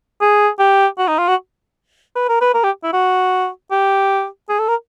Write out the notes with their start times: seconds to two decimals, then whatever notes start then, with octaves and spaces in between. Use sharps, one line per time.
0.21 G#4
0.59 G4
0.98 F#4
1.08 D#4
1.18 F4
1.28 F#4
2.16 B4
2.29 A#4
2.41 B4
2.54 A#4
2.64 G4
2.83 E4
2.93 F#4
3.71 G4
4.49 G#4
4.59 A4
4.68 A#4